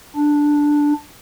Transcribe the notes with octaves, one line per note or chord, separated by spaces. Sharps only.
D4